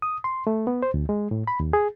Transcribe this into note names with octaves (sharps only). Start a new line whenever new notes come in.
D#6
C6
A3
B3
C5
D2
G#3
A2
B5
D#2
G#4